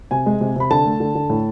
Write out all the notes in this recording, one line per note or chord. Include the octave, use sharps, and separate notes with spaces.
C3 G#5
G#3
C3
C3 B5
D3 A5
A3
D3
D3
A2